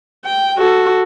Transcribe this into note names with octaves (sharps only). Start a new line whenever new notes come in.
G5
F#4 A4